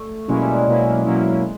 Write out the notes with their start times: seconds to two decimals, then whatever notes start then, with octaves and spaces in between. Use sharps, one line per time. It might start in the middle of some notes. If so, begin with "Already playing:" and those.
Already playing: A3
0.28 B2 F#3 G#3 A#3 C#4 E4
0.42 G3
0.54 G#3
0.67 B2 F#3 A#3 C#4 E4
1.05 B2 F#3 A#3 C#4 E4